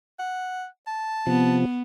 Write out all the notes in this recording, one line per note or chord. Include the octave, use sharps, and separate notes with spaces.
F#5
A5
C3 F3 B3